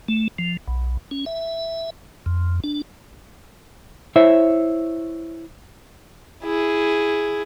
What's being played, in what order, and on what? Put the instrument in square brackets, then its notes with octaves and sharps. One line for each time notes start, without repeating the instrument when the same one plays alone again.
[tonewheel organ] A3
F3
B1
C#4
E5
F2
D4
[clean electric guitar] E4 C5 C#5 E5
[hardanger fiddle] E4 G#4